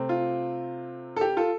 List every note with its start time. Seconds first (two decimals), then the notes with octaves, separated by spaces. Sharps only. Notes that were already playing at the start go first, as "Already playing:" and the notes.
Already playing: C3 A3 C4
0.09 F4
1.16 A4
1.21 G4
1.37 F4 A4